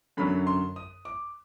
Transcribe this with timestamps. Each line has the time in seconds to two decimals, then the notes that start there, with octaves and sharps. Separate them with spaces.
0.17 F#2 D3 F#3 B5
0.47 C6
0.76 D#6
1.05 D6